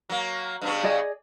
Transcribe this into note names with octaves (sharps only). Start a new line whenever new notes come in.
F#3 A#3
G2 C#3 B3
G#4 D5 D#5